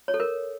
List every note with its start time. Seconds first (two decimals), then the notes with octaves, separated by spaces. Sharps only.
0.08 C#5
0.14 A4
0.20 A#4